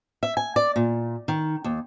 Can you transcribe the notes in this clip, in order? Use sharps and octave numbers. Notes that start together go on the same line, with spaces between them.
E5
G#5
D5
A#2
D#3
D#2